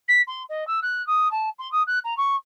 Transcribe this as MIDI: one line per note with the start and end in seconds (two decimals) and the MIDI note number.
0.08 0.22 95
0.27 0.43 84
0.49 0.66 75
0.67 0.80 88
0.82 1.05 90
1.07 1.30 87
1.31 1.49 81
1.59 1.70 84
1.72 1.83 87
1.87 1.99 90
2.04 2.17 82
2.17 2.36 85